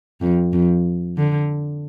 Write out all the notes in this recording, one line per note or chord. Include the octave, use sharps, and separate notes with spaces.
F2
F2
D3